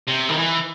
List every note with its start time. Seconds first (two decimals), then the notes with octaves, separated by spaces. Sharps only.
0.07 C3
0.29 D#3
0.37 E3